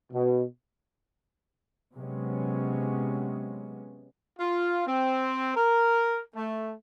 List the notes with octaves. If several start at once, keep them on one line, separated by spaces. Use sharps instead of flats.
B2
C3 F#3 G#3 B3 C#4
F4
C4
A#4
A3